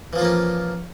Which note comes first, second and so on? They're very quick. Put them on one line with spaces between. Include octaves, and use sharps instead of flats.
E3 F3 F4 A#3 C#4